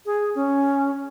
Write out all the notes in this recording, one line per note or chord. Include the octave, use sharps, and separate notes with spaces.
G#4
C#4